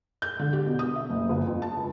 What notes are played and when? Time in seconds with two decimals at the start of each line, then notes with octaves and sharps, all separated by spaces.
0.22 G6
0.39 D3
0.53 G4
0.66 B2
0.79 D#6
0.95 E5
1.10 F#1
1.29 G1
1.47 F2
1.62 A5
1.77 C#2